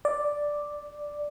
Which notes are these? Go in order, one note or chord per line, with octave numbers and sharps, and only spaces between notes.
D5